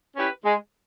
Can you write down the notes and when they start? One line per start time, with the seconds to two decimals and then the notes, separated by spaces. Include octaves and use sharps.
0.16 C#4 E4 G4 B4
0.44 G#3